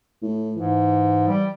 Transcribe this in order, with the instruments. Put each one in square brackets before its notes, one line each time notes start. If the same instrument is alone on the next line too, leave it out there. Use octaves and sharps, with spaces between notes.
[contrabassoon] A2
[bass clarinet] G#2 [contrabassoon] E3
[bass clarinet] G3